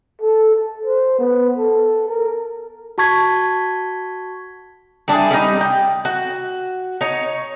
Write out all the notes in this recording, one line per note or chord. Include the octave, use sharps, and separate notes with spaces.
A4
A4
C5
B3
A4
A#4
F#4 A5 C#6 G#6 B6
G3 D4 E4 G#4
G3 C#4 D#4
G5
F#4
D#4 C#5